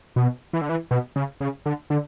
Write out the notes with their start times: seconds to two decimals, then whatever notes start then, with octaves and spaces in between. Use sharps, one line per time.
0.16 B2
0.53 E3
0.61 D3
0.69 E3
0.91 B2
1.16 C#3
1.41 C#3
1.66 D3
1.90 D3